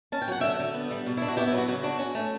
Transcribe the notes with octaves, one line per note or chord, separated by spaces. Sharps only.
C#4 A5
G5
F#3 F#5
D3 E5 G5
D3
B3
G3
B2
E4
D4
F#4
B3 E4 G4
E4
F#3
F#4
C#3 F#4
D4 F#4
C#4
A3